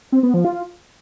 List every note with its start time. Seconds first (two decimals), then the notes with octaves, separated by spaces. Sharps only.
0.12 C4
0.23 B3
0.34 F3
0.45 F4